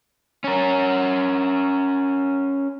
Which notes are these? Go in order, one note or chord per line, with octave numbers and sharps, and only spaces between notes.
C#4 A#4